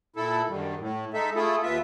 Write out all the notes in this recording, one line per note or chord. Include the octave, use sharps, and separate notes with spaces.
A#2 E4 A4
F#2 D3 D#3 G3
A2
G#3 D#4 A4 E5
A3 E4 F4 G#4 A4
D#2 B3 F4 E5